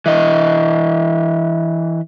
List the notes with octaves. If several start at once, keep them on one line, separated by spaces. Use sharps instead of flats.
E3 D#5